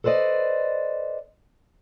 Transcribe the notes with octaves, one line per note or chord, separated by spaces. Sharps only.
A4 B4 C5 D5 D#5